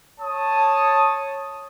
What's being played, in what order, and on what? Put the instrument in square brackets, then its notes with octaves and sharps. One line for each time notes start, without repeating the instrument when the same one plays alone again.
[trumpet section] C#5 A5 D#6